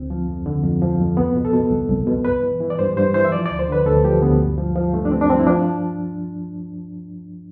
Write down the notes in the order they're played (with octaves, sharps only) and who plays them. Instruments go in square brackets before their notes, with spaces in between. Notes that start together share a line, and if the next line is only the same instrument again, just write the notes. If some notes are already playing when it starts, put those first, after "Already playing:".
Already playing: [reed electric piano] D2 C4
F3
F2
D3
F2
F3
F2
C2 B3
B2
A4
B2
C2
C2
B2
G2 B4
E3
E3
D5
G2 C5
G2 C5
E3 C5
E5
F3 D5
D2 D5
C5
D3 B4
D2 A4
F3 G4
D2 B3
G2
F3
F3
G2 A3
D4
G2 C4
D4
F3 C4
E4
F3 D4